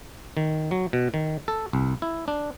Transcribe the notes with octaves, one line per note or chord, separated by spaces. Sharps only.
D#3
F#3
B2
D#3
A4
C2
E4
D4